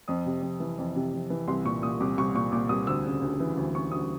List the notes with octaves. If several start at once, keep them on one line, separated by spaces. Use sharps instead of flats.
F2 D#6
C3
F2
E3
F2
C3
F2
E3
C2 C6
A#2 C#6
A#2 D#6
C2 D6
C2 C#6
A#2 C#6
A#2 D6
C2 D#6
D2 E6
C#3
D2
E3
D2
C#3 C#6
D2 D#6